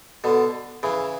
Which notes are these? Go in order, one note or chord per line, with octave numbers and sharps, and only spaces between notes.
B2 D3
C#3 E3